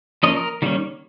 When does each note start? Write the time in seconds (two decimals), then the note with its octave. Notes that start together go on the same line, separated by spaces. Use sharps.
0.23 F3 A#3 C#4 D#5
0.36 A#4
0.62 D#3 G3 A#3 C#4